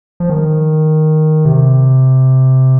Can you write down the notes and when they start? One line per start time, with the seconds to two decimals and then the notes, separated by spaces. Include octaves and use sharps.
0.20 F3
0.30 D#3
1.45 C3